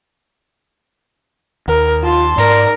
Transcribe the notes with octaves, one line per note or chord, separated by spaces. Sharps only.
D#2 A#4
F4 A5 C6
G#2 G#3 A#4 D5